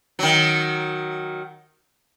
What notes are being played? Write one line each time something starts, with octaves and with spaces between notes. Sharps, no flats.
D#3 F#3